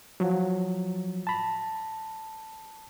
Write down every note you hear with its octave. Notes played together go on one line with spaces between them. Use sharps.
F3 F#3
A5 B5